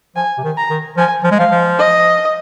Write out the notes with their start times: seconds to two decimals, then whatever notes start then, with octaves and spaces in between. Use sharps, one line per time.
0.16 F3 G#5
0.38 C3
0.43 D#3
0.57 A#5
0.70 D#3
0.97 F3 G#5
1.24 F3
1.32 G#3
1.38 F3 F5
1.51 F3
1.78 D#5